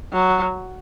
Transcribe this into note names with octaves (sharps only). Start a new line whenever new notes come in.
F#3